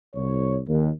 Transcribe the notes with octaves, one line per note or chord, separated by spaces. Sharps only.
C2 C#5
D#2